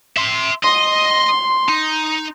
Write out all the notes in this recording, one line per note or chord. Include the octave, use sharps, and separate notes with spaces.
E5 C6
D#5 C6
D#4